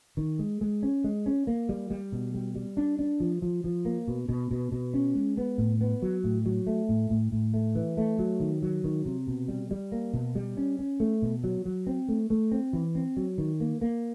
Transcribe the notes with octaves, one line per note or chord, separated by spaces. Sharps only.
D#3
G#3
G#3
C#4
G#3
C#4
A#3
G3
G3
B2
G3
G3
D4
D4
F3
F3
F3
A#3
B2
B2
B2
B2
C#4
G#3
B3
A2
B3
F#3
A2
F#3
A3
A2
A2
A2
A3
E3
A3
F#3
D#3
F#3
D#3
C3
B2
G3
G3
A#3
B2
G3
C#4
C#4
A3
B2
F#3
F#3
C4
A3
A3
C4
E3
C4
F#3
D#3
A#3
A#3